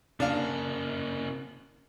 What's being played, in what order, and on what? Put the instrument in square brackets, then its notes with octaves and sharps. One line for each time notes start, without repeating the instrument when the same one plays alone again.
[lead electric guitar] C#3 A#3 [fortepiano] D4 F5